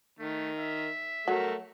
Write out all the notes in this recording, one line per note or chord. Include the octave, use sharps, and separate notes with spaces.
D#3 A3
E5
F#3 A3 A#4